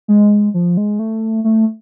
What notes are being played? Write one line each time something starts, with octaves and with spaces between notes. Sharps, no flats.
G#3
F3
G#3
A3
A3